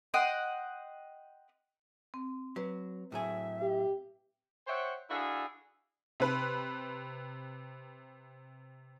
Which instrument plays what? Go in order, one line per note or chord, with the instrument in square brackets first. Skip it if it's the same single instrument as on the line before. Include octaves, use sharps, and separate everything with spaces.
[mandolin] D#5 F#5 G5 C6
[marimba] C4
[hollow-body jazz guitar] F#3 [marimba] B4
[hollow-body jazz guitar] A2 F#3 G#4 [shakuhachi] E5
[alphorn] G4
[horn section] C5 C#5 E5 F#5 G5
D4 E4 F#4 G#4 A4 F5
[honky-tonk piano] C3 B4